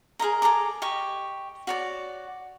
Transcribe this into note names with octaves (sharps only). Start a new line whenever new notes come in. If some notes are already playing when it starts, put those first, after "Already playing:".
G#4 A#4 D#5 A#5
G#4 A4 A#5 D6
G4 D#5 C#6
F#4 C#5 D5